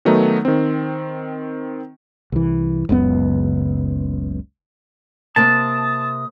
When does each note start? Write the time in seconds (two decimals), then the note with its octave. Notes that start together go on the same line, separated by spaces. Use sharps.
0.05 D#3 F#3 A3 B3 D#4
0.45 D#3 C4
2.32 C2 E3
2.89 F#1 C#2 F#2 B3
5.36 C3 A#3 C4 A5 D#6